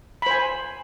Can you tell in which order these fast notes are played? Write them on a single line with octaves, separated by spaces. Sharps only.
B5 C5 G#5